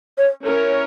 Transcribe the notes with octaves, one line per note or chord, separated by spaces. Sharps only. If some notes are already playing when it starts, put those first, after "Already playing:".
C#5
C#4 E4 A#4 C#5